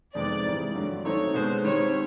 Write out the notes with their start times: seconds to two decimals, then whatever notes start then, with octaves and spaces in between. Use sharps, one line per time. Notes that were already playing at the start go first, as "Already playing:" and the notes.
0.15 F2 C3 D#3 G#3 B3 D5
0.45 G#2 E3 G3
0.75 G2 D3 F#3
1.05 D#3 F#3 A3 C4 D#4 C#5
1.34 B2 G#3 B3 C5
1.64 D#3 G3 C4 C#5